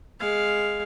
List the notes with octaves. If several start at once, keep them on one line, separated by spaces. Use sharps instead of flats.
G#3 F5